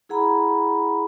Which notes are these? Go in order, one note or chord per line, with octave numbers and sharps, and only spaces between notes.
E4 G#4 F#5 A#5 B5